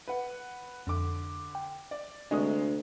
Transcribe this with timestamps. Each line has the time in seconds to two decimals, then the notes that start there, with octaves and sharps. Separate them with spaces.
0.08 B4 F#5
0.87 F2 D3 D6
1.55 G5
1.91 D5
2.31 D2 C3 G#3 D#5 C#6 D#6